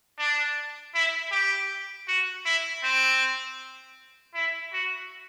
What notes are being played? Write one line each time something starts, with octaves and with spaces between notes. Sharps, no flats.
D4
E4
G4
F#4
E4
C4
E4
F#4